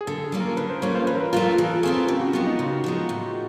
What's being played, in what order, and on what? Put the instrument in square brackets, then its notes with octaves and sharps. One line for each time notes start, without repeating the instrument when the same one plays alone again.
[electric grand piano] G#4
[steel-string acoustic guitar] D3 [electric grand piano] A4
[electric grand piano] G#4
[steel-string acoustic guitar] G3 A#3 C#4 F4
[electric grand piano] A#4
[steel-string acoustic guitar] D3 [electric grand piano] B4
[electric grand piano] C5
[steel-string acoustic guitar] G3 A#3 C#4 F4 [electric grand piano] C#5
[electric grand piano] C5
A#4
[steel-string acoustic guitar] E3 [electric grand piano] B4
[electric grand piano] A#4
B4
[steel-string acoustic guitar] A3 C4 F4 [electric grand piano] A#4
[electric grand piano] A4
[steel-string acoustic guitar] E3 [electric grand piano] G#4
[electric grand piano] A4
[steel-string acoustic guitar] A3 C4 F4 [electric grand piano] G#4
[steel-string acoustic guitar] C#3 [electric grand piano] G4
[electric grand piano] F#4
[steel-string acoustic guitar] F3 G#3 B3 [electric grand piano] F4
[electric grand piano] D#4
[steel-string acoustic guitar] C#3
F3 G#3 B3
A2